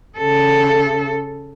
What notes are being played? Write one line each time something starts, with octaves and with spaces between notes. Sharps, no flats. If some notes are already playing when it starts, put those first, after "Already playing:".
C#3 A4